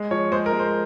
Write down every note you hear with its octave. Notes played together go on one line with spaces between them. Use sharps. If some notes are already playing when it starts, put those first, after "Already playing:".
Already playing: G#3
F3 C#5
G#3 C5
A#4
G#3
C5